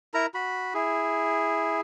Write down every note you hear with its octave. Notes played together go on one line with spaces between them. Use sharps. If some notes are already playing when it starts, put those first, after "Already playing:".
E4 A#4 A#5
F#4 B5
E4 G#4